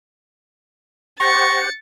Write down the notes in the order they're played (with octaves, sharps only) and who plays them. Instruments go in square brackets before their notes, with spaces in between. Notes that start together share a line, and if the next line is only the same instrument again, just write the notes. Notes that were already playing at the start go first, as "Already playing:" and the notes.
[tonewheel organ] G4 C5 F#5 [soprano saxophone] C#6 [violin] A6 C#7 [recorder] A#6